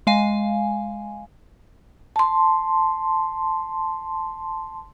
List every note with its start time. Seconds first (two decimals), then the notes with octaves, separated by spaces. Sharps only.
0.07 G#3 F5 G#5
2.16 A5 C6